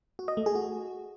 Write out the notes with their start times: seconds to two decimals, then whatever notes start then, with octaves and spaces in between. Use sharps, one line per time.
0.19 F#4
0.28 D#5
0.37 A3
0.46 G#4
0.55 F#4